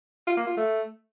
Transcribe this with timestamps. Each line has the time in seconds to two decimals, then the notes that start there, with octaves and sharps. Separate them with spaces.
0.27 F4
0.37 A#3
0.47 F4
0.57 A3